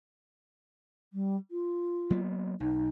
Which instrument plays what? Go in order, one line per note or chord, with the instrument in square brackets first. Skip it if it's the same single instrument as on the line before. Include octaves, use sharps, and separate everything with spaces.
[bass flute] G3
F4
[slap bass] F#3 A#3 B3
[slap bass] B1 [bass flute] D#4